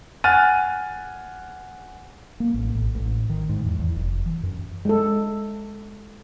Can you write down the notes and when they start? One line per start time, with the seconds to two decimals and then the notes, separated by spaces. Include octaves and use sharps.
0.24 F#5 G#5 F6 F#6 A6 D#7
2.40 A#3
2.54 A1
2.75 A1
2.95 A1
3.30 D#3
3.49 G#2
3.66 E2
3.79 E2
3.95 F1
4.26 E3
4.43 F#2
4.85 G#3 A4